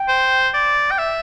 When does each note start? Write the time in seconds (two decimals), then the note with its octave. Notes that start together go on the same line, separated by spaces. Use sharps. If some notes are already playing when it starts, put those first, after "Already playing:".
Already playing: G5
0.08 C5
0.54 D5
0.91 G5
0.98 E5